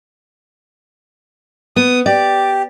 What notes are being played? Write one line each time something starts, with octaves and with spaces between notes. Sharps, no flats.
B3 D#6
G4 D5